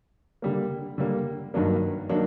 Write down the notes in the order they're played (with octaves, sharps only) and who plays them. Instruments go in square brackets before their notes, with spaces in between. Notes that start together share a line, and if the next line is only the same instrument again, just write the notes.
[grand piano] D3 G3 A#3
D3 G3 A#3
G2 D#3 F#3 A#3 D4
D#3 F#3 A#3 D4